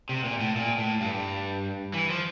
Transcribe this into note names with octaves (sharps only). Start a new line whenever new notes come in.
C3
A#2
A2
A#2
A2
G2
E3
F3